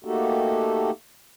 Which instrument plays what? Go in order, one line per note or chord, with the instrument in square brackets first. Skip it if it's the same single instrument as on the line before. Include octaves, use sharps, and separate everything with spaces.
[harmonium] A3 A#3 D#4 F#4 G4 A4